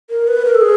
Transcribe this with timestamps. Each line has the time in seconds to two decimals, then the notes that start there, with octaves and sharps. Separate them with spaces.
0.10 A#4
0.28 B4
0.45 A#4
0.55 A4
0.61 G#4